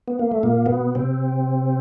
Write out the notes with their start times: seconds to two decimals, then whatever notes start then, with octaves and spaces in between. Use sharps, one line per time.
0.08 B3
0.19 A#3
0.32 A3
0.43 A#2 A#3
0.66 B2 B3
0.95 C3 C4